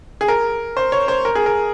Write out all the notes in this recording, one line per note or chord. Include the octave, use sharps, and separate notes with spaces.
G#4
A#4
C5
C#5
C5
A#4
G#4
A#4